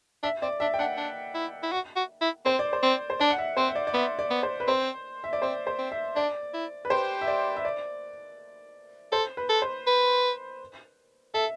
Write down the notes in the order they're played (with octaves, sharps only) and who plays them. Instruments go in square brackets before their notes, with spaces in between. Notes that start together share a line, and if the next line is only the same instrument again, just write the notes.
[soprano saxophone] D4 [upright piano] E5
[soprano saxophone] C4 [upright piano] D5
[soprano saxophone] D4 [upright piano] E5
[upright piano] G5
[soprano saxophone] D4 [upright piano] F#5
[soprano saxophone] D4
E4
E4
F#4
F#4
E4
[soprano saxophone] C4 [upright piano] C5
[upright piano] D5
C5
[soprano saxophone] C4
[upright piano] C5
[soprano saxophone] D4 [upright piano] D5
[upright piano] F#5
E5
[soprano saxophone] C4 [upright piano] C5
[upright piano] E5
D5
D5
[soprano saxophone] B3 [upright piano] E5
[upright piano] D5
[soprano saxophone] B3
[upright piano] C5
B4
[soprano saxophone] C4 [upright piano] C5
[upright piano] E5
D5
[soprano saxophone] C4 [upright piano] C5
[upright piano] C5
[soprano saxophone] C4
[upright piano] E5
[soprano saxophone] D4 [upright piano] D5
[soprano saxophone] E4
[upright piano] B4
[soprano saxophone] G4 [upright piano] C5
[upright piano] E5
D5
E5
D5
[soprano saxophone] A4 [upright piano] C5
[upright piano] B4
[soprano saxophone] A4
[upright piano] C5
[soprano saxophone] B4
[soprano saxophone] A4 [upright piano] E5